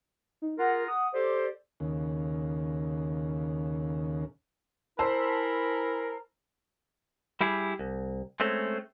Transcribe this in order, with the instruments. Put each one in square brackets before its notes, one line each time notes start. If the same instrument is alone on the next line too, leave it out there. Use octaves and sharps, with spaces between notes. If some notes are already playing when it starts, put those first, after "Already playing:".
[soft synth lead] D#4
[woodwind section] F4 G#4 A#4 [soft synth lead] F#5
[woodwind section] D#6
[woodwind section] G4 A4 C5 [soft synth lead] D5
[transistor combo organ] D#2 C#3
[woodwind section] E4 G#5 B5 [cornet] A#4 [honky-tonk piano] C5 A5 E6
[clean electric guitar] G3 E4 G4 G#4
C2
G#3 A3 C4 C#4